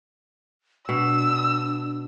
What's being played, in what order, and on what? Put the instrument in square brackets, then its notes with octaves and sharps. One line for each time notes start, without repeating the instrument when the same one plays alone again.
[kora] B2 [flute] D4 [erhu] E6